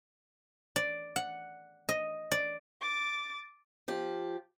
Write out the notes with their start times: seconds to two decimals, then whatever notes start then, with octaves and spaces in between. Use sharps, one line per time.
0.76 D5
1.16 F#5
1.89 D#5
2.32 D5
2.81 D6 A6
3.88 F3 G4